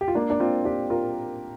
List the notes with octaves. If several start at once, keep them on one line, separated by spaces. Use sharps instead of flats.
G4
F4
A#3 D4
D4
C4 F4
D4 G4
F4 A#4